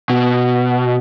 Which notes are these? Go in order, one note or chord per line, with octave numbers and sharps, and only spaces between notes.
B2